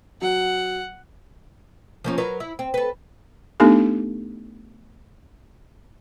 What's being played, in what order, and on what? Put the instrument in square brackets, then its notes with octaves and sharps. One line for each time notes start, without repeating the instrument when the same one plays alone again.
[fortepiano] F#3 [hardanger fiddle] F#5
[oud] F3 A#3 C#4
F#3 A#4 B4
E4
C4
A4 B4
[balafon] A3 B3 D4 D#4 G4 A4